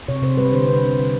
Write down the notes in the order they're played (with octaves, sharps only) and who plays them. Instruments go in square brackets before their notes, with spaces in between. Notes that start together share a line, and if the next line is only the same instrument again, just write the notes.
[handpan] C3 C#5
C3 C5
G3 B4
D3 C5
C5
D3 B4